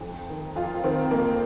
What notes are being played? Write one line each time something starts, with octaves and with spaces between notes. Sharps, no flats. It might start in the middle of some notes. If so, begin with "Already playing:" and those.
F2
D#3
F2 F4
D#3 C4
F2 A#3